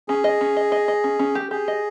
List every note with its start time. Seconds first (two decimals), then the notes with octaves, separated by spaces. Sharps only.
0.08 C#4 G#4
0.24 D#5
0.41 C#4
0.57 D#5
0.72 D#5
0.88 D#5
1.04 C#4
1.19 C#4
1.35 G4
1.51 G4 G#4
1.68 D#5